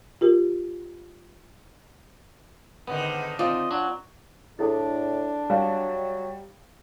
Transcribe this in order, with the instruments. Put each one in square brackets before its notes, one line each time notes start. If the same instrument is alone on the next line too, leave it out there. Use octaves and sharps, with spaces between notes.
[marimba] F4 G4 A#4
[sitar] G#2 D3 D#3 [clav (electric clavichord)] B3
[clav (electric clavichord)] C4 D5 [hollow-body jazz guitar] F4 [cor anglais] D#5
[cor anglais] F#3 [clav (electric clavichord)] D4
[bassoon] A2 [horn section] D4 [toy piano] E4 G#4 A4
[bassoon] F#3 [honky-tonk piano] G3 [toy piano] F#4 F5